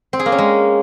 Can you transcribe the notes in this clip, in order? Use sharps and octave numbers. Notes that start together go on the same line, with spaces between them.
C4
G#4
A#3
C#4
G#3